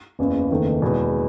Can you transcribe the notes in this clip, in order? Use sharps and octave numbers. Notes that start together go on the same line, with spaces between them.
F#1 E2 C#3
F#1 E2 D#3 A3
E2 B2 G#3 B3